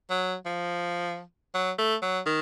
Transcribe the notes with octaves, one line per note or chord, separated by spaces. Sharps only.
F#3
F3
F#3
A3
F#3
D#3